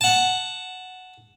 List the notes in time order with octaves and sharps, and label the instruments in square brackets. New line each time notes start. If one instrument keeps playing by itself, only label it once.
[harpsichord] F#5 A5